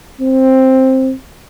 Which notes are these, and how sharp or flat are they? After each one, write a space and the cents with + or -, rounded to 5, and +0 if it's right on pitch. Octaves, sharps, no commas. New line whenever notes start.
C4 +10